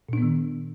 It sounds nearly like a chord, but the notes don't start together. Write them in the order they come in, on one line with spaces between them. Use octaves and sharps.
A#2 D4 B3 D#3